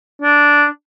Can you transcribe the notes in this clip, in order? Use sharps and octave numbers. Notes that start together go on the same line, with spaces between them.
D4